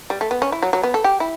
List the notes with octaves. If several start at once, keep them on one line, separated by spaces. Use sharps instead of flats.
G3
A3
B3
C#4
E4
F#3
F#3
B3
A4
G4
E4